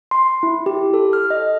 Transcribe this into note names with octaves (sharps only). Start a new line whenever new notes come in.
C6
E4
G4
A4
F6
D#5